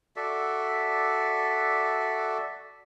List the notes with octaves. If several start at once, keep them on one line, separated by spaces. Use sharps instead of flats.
F#4 A4 D5 E5